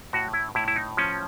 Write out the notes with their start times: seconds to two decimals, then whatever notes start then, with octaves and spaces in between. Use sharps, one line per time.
0.13 A2 F#4
0.33 E4
0.55 A2 E4
0.68 E4
0.76 D#4
0.97 F3 C#4